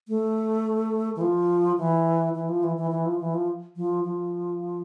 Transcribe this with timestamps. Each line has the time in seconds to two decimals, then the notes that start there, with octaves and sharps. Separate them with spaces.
0.08 A3
1.16 E3
1.21 F3
1.78 E3
2.35 E3
2.49 F3
2.64 E3
2.77 E3
2.91 E3
3.06 F3
3.20 E3
3.34 F3
3.76 F3
4.04 F3